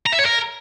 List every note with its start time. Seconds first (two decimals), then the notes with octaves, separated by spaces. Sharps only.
0.07 A#5
0.13 E5
0.19 C#5
0.26 A#4